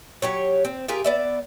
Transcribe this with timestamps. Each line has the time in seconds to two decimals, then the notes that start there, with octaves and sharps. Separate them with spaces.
0.22 F#3 G4 C#5
0.65 C4
0.88 F4 G4 G#4 A#4
1.04 B3 D5 E5